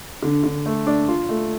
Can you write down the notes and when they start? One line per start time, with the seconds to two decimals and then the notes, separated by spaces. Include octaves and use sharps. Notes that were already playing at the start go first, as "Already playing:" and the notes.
0.23 D3
0.44 D3
0.66 A3
0.87 D4
1.08 F4
1.29 A3